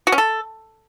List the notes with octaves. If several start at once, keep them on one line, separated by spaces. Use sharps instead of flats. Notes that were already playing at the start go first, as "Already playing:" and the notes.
F#4
C#4
A4